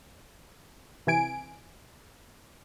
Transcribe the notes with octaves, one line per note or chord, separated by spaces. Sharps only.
C3 E3 G#5 D7